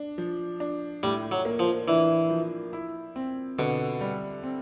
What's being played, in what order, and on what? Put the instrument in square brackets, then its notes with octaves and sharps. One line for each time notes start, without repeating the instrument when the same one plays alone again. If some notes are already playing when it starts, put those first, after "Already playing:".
Already playing: [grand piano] D4
F3
D4
[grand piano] A2 [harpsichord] G3
[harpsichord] F#3
[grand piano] A#3
[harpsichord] F3
[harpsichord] E3 [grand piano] D4
[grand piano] F3
E4
C4
[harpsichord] B2 [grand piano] D3
[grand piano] G3
C4